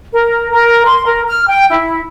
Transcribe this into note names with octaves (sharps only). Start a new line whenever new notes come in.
A#4
A#4
C6
A#4
F6
G5
E4